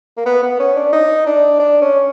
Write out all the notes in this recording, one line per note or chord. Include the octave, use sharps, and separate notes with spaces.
A#3
B3
B3
C#4
D4
D#4
D4
D4
C#4